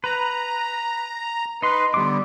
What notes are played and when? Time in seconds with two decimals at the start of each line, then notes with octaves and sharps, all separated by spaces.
0.04 B4 A#5
1.62 D#4 B4 C6
1.94 D3 G3 B3 D6